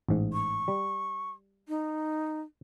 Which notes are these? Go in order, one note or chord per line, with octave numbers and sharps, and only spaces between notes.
A1 G#2
C#6
G3
D#4